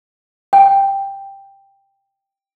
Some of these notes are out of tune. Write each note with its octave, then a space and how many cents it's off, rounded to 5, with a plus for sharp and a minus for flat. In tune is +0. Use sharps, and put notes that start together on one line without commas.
G5 +5